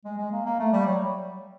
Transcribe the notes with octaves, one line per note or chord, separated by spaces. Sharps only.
G#3
G#3
A#3
A#3
A3
G3
F#3